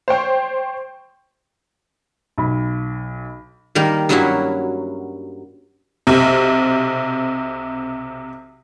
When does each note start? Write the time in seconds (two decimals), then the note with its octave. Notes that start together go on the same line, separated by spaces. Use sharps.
0.08 C5 C#5 G5
2.38 B1 B5
3.75 D#3 G3 A#3 A#4
4.09 G2 F#3 A#3 C#4 E4 F#4
6.07 B1 C3